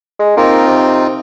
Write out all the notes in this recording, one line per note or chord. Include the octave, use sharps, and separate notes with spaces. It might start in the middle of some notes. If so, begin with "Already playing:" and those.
G#3
A#3 C4 D#4 F4
C3